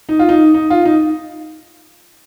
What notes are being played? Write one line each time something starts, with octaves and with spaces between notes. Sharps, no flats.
D#4
F4
D#4
D#4
F4
D#4